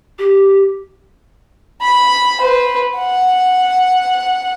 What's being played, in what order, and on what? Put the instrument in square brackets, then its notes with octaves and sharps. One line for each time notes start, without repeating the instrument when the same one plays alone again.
[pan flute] G4
[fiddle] B5
B4 C5
F#5